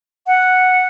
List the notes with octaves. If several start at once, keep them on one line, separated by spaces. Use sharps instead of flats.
F#5